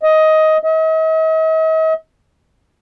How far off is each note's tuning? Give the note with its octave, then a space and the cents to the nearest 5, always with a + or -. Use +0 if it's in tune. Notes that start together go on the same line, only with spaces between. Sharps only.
D#5 +15
D#5 +45